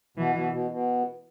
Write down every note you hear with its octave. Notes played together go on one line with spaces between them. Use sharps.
B2 E3
B2
B2
B2